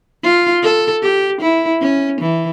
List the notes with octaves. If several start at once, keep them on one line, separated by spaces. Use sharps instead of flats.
F4
A4
G4
E4
C#4
E3